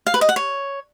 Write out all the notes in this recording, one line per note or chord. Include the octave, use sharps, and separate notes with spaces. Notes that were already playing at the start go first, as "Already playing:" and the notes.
F5
B4
D#5
F#5
C#5